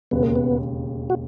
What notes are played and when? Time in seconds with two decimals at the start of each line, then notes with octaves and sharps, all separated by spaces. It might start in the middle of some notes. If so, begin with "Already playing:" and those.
0.11 E1 D#2 C#3 B3
0.23 A#3
0.35 B3
1.10 F#4